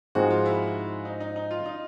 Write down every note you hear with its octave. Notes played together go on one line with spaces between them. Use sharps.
G#2 F3 G#3 C4 F#4
F4
E4
D#4
D#4
D#4
F4
D#4